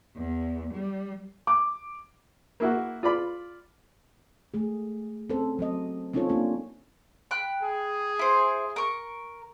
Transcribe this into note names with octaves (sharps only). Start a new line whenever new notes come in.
E2
G3
D6
A#3 E4 F#4
F4 D5 B5
A3 G#4
C4 C#4 A4 C5
F#3 C4 D#5
C4 C#4 D#4 F4 A4 C#5
A#3 D4 F4 G4
G5 B5 F#6
G#4
E4 C5
A#4 C#6